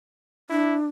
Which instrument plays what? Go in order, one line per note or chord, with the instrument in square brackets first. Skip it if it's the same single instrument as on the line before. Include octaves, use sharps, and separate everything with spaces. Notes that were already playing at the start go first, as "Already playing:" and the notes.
[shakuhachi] D4 [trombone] E4